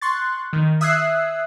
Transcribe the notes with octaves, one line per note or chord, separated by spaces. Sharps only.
C6 C#6 F#6 A6
D#3
E5 D#6 E6 F#6 G#6 C7